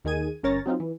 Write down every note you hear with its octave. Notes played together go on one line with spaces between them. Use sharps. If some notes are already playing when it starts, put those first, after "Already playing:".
D#2 D#3 G#4 G#6 D#7
G1 C#4 A#4 C#5 A6 A#6
F#3 C4 D#4 F4
E3